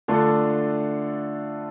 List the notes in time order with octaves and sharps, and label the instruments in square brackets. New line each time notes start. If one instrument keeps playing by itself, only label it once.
[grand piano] D3 A3 D4 F4 A4